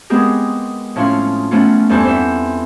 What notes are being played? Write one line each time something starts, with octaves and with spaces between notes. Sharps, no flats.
G#3 B3 C4 G4 G#4 A#4
A2 F3 C#4 F5 C6 C#6
F3 A3 B3 C#4 F4
E2 G2 A4 C5 G#5 F#6
C4 C5 E5 F#5